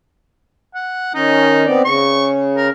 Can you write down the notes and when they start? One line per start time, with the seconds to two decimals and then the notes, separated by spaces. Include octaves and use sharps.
0.74 F#5
1.14 D#3 C#4 D#4
1.66 B3 C4 D5
1.85 C#3 C#6
2.56 A#4